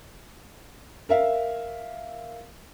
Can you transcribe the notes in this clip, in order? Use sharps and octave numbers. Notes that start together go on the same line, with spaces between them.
A#4 E5 F5